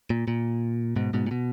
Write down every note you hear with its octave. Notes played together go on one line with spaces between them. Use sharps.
A#2
A#2
G#2 B2
G#2 B2
A#2
B2